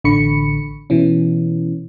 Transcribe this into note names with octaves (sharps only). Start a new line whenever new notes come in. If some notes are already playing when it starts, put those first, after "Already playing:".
A1 D3 B5 C#6 C#7
B2 E3 C#4